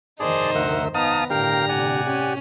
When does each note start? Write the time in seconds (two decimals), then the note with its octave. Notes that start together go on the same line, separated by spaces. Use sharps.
0.20 F1 G2 D#3 D#4 G#4 C5 D5 A5
0.55 D2 A#4 E5 F#5
0.95 B3 D#4 F5 A5 A#5 D#6
1.30 G1 A2 D3 G4 A#4 F5 G5 A#5
1.69 A2 C3 D5 F#5 G#5
2.07 C#4 G4